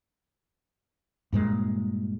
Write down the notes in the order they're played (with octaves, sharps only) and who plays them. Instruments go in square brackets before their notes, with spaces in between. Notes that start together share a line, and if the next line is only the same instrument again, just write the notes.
[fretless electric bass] G2 A#2 G#3